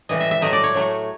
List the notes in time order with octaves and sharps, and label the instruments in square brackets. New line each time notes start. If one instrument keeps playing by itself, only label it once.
[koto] A2 E3 G3 D#5
E5
E5
A2 F#3 A3 D#5
D5
C#5
A2 F#3 A3